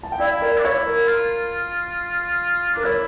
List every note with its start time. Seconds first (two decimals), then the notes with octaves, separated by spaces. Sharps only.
0.03 A5
0.12 G5
0.19 E4 D5 F5
0.41 A#4 D5
0.58 D4
0.64 E4 C#5
0.86 A#4
1.08 F4
2.74 D4 A#4
2.84 E4 C#5